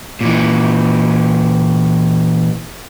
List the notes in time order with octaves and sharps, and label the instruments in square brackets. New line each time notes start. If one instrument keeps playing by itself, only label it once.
[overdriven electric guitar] A#2 E3